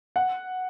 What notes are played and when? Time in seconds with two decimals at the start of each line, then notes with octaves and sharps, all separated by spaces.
0.16 F#5